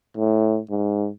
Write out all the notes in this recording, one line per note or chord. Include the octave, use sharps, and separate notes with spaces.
A2
G#2